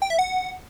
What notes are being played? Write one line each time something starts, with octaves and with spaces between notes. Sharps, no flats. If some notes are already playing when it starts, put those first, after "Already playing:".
G5
E5
F#5